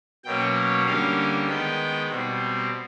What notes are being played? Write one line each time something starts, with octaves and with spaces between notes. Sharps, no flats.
B2 F#3 A#3 C#4 G5
D3 G3 A#3 C#4 F5
D#3 G#3 B3 G5
B2 G3 C4